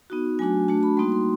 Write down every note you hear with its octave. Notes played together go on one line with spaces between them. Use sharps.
B3 D#4 F#4
F#3 A3 D4 F#4 G#5
A3 D4 F#4 A5
B5
G3 A#3 D#4 F#4 C6
C6